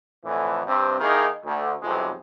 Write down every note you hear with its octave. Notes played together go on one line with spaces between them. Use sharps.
F2 A2 D3 E3
G2 C3 C4
D#3 A#3 D#4 E4 G#4 A#4
D2
B1 F2 C3 E3 F3 G#3